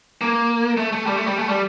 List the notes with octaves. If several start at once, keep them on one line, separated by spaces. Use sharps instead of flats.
A#3
A3
A3
G3
A3
G3
A3
G3